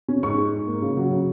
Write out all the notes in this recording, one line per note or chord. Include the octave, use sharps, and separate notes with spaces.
C#4
G#2 C#6
G#3
G#2
A#3
C#3
F#3
C#3